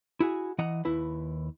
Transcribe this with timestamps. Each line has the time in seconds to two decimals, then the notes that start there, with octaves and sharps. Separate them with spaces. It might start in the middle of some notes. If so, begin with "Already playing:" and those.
0.20 E4 F#4 G#4
0.58 E3 D#5 F#5 A#5
0.85 D#2 E4 B4